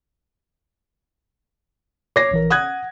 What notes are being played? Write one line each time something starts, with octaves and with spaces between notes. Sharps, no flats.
C#5 D6 G#6 A#6 C7
A#1 E3 A#4
F#5 D#6 F#6 G#6